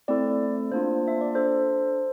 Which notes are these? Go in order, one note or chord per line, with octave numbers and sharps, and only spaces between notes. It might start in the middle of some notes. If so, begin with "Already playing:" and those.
A3 C4 E4 A4 D5
A#3 D4 F4 C5
E5
D5
D4 A4 C5